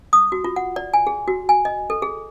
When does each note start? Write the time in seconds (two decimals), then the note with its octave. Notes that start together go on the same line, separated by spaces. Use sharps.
0.13 D#6
0.32 F#4
0.44 F4
0.56 F#5
0.76 D5
0.94 G#5
1.07 G#4
1.28 F#4
1.49 G#5
1.65 D#5
1.90 A4
2.02 G#4